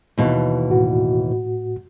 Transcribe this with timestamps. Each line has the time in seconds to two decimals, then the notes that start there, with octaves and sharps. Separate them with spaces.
0.18 D#2 B2 E3
0.70 A2 F#4